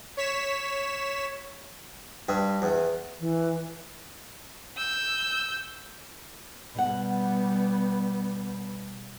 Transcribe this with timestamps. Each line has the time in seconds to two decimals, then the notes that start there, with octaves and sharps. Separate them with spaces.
0.17 C#5 B6 E7
2.29 G2
2.62 E2
3.20 E3
4.77 E6 G6
6.75 B2 G3 B3 G4 F#5